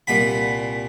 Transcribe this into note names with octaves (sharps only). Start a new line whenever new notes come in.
C2 A#2 F#5 B5